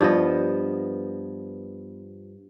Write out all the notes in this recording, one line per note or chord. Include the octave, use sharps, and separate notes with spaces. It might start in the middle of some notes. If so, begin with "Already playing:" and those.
G2 F3 B3 D#5